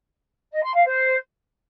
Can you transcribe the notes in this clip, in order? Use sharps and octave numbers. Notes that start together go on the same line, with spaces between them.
D#5
C6
F5
C5